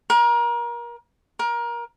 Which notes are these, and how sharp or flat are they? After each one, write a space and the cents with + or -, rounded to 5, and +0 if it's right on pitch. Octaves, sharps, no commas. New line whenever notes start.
A#4 +30
A#4 +25